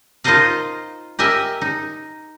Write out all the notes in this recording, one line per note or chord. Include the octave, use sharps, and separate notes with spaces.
D#4 F4 A#4 C5 D#5 F5
G4 A#4 D#5 E5 G#5
D#4